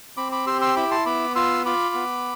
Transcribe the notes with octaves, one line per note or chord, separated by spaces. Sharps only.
C4 B5 D6
B5 D6
G4 C6 E6
C6 E6
E4 B5 D6
A5 C6
B3 B5 D6
F4 C6 E6
F4 B5 D6
B3